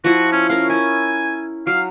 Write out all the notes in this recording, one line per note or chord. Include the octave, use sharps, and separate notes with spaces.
F3 E4 F#4
C#4
C#4 A#4 F5
E4 G#5
F#3 F5